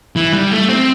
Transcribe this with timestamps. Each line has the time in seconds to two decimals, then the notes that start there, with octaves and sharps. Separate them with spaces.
0.16 E3
0.34 G3
0.51 A3
0.69 C4